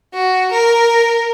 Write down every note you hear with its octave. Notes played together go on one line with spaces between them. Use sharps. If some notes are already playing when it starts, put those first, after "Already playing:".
F#4
A#4